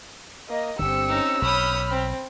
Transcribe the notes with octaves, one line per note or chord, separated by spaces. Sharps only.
A#3 D#5
G1 D3 C4 G4 E6 C#7
C#4 D#4
B1 C#5 B5 D#6 F6 G6
C4